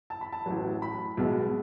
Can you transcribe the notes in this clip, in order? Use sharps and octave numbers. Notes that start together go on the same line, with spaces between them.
A5
B5
A5
A1 A2 F#3
B5
B1 B2 G#3